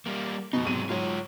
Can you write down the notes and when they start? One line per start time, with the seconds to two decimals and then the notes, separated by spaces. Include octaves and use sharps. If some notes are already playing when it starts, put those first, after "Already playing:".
0.06 G3 A#3
0.53 F2 B2 D#4
0.65 G#2 C3 F#3 G#3 D#7
0.89 G#2 F#3 F4 C#5